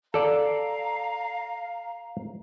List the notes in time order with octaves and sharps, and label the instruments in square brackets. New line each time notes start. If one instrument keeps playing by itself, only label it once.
[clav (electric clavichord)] A4 D5 [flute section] F5 A#5